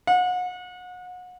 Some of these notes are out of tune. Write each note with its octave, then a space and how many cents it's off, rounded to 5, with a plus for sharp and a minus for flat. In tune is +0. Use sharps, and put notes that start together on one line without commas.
F#5 -35